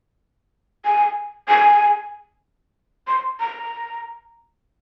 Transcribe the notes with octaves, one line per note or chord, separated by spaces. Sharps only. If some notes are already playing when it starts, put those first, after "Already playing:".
G#5
G#5
C6
A#5